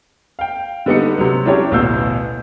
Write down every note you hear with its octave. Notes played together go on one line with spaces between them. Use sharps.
F5 G5
D3 G3 B3 D#4 D#5 C#7
C3 F#3
F#3 C#4 D4 E4 G4 C#5
A1 D2 B2 F5 E6 G6